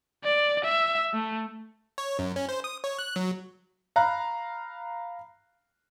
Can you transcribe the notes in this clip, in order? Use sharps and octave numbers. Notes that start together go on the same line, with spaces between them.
D5
E5
A3
C#5
F#2
C#4
C5
D#6
C#5
F#6
F#3
F5 A#5 B5 F#6